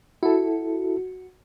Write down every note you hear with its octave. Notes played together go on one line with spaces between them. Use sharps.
E4 F#4 A4